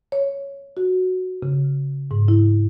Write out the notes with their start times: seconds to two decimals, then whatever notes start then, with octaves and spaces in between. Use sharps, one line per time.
0.12 C#5
0.77 F#4
1.43 C#3
2.11 G#2
2.28 E4